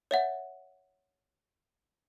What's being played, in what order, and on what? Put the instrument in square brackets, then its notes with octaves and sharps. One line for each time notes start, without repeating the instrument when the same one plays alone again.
[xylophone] C#5 E5 F#5